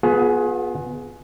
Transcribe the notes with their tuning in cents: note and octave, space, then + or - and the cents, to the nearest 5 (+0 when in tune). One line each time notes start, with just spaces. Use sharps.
B3 +0 F4 +40 G#4 +20